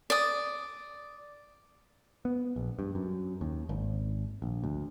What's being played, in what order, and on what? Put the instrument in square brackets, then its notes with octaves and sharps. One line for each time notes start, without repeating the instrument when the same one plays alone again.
[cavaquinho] D5 D#6
[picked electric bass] B3
A#1
G2
F#2
D#2
G#1
A#1
D2